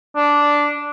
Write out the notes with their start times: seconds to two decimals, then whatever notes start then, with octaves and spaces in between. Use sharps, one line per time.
0.16 D4